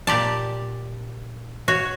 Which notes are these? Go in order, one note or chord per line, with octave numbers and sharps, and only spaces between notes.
A#2 G4 D5 A5
F#4 C#5